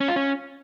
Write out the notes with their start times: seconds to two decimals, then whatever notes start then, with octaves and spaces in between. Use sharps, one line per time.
0.01 C#4
0.08 F4
0.16 C#4